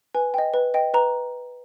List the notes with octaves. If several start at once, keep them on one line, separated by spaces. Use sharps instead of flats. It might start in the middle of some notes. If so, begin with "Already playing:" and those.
B4 G#5
D#5 G5
B4
D#5 G5
B4 A#5